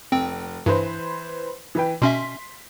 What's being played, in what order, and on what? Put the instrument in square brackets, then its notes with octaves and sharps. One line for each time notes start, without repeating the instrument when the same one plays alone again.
[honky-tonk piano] F1 [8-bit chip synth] C4 G5
[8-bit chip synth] G2 [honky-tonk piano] E3 B4 C5
[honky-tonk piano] E3 B4 G5
[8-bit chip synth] B2 C#4 E5 [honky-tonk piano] C6 B6